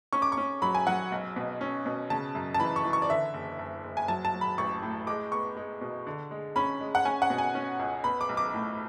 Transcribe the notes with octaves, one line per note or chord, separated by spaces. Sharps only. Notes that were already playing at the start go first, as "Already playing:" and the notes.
C#4 C#6
D6
C#6
C#4
F#3 B5
G#5
F#3 F#5
B1
B2
C#4
B2
C#3 A5
F#2
A5
E3 B5
C#6
E3
C#6
D5
D3 E5
F#1
F#1
F#1
G#5
F#3 A5
A5
F#3
B5
A1 C#6
A2
G#3 D6
B3 C#6
G#3
B2
D3
G#3
C#4 B5
G#3
F#5
C#4 G#5
F#5
B2
G#5
C#4
C#2
B3 B5
D6
B1
D6
A2